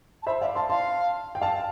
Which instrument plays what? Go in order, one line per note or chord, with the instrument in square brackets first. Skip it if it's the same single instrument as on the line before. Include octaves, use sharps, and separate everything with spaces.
[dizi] A5
[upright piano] C5 E5 [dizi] B5
[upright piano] D5 F5 [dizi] E5
[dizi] F5 [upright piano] A5 C6
[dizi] F5 [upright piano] A5 C6
[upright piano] G5
F5 A5